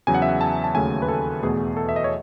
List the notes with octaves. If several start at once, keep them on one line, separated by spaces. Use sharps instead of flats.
E2 C#3 F#3 C#4 G#5
F#5
E5
F#5
A5
A5
D#2 C#3 F#3 A3 G#5
B4
A4
E2 B2 A3 G#4
A4
E5
D#5
C#5